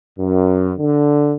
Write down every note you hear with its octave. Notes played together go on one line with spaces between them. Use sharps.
F#2
D3